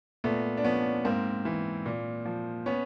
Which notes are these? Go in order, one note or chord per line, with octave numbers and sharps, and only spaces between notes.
A#2 A3 B3
D4
F3 B3 C#4
G#2 A#3 C4
E3
A#2
F3
B3 C#4